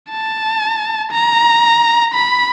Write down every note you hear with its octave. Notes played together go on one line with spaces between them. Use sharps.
A5
A#5
B5